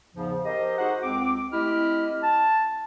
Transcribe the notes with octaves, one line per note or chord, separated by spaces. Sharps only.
E2 G#2 C#3 F3
G4 A#4 C5 D#5
D#4 F#4 G#4 C5 F#5
C#2 C4 D6
A3 C4 E4 G4 D#5 F6
A5